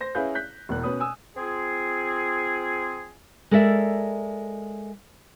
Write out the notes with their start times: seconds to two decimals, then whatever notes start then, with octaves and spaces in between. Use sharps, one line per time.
0.01 C5 A#6
0.15 C#4 E4 G#4 B4 F5 G6
0.35 F#6 G6 B6
0.69 E1 E2 F#6
0.83 B2 C#4 B4 D#6
1.00 G#5 D#6 E6
1.37 C4 F4 G#4
3.51 G#3 A4 A#4 D5 E5